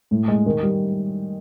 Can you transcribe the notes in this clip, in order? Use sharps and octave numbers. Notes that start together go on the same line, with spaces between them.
A2
G#3
D#3
G3